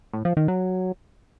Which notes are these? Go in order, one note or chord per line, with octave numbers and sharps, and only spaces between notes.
A2
F3
D#3
F#3